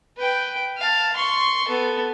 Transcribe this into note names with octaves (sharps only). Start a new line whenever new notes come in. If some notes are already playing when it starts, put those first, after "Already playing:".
B4 G5
F5 A5
C6 C#6
B3 A4